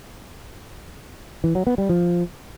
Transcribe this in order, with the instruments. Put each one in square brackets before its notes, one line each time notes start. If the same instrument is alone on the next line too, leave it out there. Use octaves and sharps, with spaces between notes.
[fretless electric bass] E3
F#3
B3
G3
F3